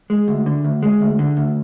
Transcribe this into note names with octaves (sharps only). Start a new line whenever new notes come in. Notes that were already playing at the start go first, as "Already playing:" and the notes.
G#3
D2
D3
D2
G#3
D2
D3
D2